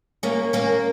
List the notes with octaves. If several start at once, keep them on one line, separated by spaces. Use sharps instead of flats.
A#3 C#4
A#3 C#4